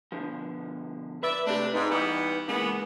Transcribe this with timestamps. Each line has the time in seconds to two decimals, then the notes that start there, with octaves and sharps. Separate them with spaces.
0.12 B2 D3 F3
1.23 B4 D5 E5
1.47 C3 A3 D4 G4
1.74 G#2 D#4 B4
1.90 E3 G3 B3
2.48 C#3 E3 G#3 A#3 B3